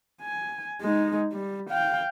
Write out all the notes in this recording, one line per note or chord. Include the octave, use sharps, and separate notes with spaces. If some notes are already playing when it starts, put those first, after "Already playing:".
G#5
G#3 D#4
G3
F5 G5